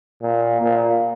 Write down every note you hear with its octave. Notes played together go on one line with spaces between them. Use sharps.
A#2
A#2